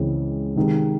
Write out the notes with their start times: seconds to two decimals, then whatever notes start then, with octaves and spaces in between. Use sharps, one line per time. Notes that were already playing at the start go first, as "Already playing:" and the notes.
Already playing: C#2 C#3 E3 G#3 C4
0.56 C3 D#3 G#3